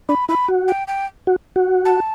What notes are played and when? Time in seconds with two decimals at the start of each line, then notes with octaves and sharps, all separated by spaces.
0.09 D4 B5
0.29 E4 B5
0.48 F#4
0.68 G5
0.88 G5
1.27 F#4
1.56 F#4
1.85 A5